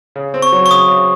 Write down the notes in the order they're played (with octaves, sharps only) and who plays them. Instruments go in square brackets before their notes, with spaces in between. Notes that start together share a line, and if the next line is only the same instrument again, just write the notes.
[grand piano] C#3
C4
[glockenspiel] C#6
[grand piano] F#3
[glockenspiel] C#6
[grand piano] C#3 [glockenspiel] D#6
[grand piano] C#3